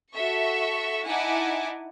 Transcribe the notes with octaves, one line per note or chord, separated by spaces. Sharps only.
F#4 A4 E5 C#6
D#4 E4 F#5 G#5 A5 D6